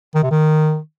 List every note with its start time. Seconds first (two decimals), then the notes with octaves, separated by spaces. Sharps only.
0.15 D#3
0.23 C3
0.31 D#3